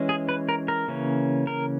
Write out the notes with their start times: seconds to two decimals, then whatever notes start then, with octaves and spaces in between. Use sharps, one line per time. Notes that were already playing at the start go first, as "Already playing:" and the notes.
Already playing: E3 G#3 C#4
0.09 G#4
0.29 B4
0.49 A#4
0.68 A#4
0.88 C#3 E3 A#3 C#4
1.47 A#4